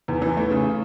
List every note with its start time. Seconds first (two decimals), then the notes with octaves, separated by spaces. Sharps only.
0.08 E2
0.22 E3
0.37 A3
0.51 C#3